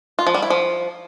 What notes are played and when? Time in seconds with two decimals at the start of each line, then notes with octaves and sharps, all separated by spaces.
0.19 F4
0.27 F3
0.34 G3
0.42 E4
0.50 F3